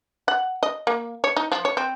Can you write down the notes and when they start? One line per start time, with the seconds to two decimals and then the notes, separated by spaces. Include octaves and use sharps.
0.28 F#5
0.63 D#5
0.87 A#3
1.24 C#5
1.37 D#4
1.52 F3
1.65 C#5
1.77 C4